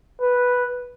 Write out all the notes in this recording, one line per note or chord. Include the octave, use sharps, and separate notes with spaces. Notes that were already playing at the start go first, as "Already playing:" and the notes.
B4